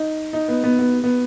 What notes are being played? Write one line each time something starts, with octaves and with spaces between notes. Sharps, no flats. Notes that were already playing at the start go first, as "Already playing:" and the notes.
Already playing: D#4
D#4
B3
B3
B3
B3